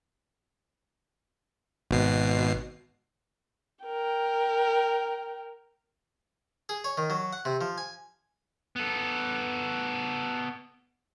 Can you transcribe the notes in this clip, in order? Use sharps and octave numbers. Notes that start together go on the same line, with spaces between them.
G#1 B2 C7
A#4 G5
G#4
C#5
D#3
F#3
F#5
C3
F3
G#5
B3 A4